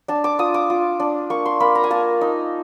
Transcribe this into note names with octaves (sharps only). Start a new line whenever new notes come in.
D4 A5
D6
F4 D#6
D6
F4
D4
A#3 C#6
C6
A#3 B5
A#5
G#5
A#3 A5
D#4